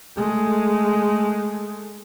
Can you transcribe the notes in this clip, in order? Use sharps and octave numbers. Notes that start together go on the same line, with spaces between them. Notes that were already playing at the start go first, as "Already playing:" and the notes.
G#3 A3